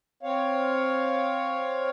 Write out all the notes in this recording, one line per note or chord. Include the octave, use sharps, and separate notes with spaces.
C4 C#5 F5